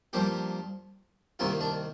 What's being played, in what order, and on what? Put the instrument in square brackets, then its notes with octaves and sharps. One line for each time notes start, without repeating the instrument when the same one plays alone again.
[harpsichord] G2 F3 A#3 G4
C2 C3 D#3 A#3 F4
D4